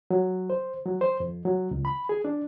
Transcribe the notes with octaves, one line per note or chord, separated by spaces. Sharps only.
F#3
C5
F#3
C5
F2
F#3
C#2
B5
G#4
D4